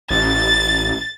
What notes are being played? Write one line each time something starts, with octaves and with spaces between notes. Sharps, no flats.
A1 A6